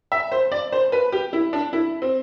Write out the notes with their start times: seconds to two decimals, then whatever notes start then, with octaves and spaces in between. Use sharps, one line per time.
0.12 E5
0.32 C5
0.52 D5
0.72 C5
0.92 B4
1.12 G4
1.33 E4
1.53 D4
1.73 E4
2.02 C4